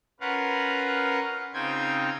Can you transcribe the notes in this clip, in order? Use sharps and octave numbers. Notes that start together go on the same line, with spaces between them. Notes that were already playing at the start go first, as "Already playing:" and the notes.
C#4 F4 A#4 B4 F5 F#5
C#3 C4 D#4 F4 G5 G#6